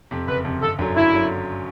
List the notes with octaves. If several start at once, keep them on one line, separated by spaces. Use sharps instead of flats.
F2 C3
F#1 B4
F2 C3
G1 A4
F#2 D3 F#3
G1 E4
D3 F#3